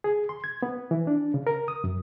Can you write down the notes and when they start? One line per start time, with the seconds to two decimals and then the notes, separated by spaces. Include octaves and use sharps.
0.04 G#4
0.29 C6
0.44 G#6
0.62 B3
0.91 E3
1.07 D4
1.34 C#3
1.47 A#4
1.68 D#6
1.84 F#2